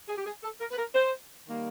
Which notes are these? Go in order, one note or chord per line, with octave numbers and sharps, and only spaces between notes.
G#4
G4
G#4
A4
A#4
B4
A#4
C5
D#3 G3 A#3